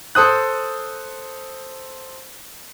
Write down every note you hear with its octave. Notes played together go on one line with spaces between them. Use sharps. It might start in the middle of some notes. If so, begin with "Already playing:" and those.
A4 C5 D#6 F#6